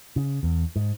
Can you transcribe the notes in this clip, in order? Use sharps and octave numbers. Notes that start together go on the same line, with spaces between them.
C#3
E2
G#2